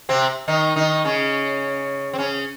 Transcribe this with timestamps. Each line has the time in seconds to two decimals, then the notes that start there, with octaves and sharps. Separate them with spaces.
0.09 C3 C4
0.48 D#3 D#4
0.76 D#3 D#4
1.05 C#3 C#4
2.13 C4
2.18 C#3 C#4